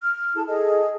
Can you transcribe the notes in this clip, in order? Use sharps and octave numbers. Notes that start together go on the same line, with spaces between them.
F6
E4 G#4 A4 A5
G#4 A4 D#5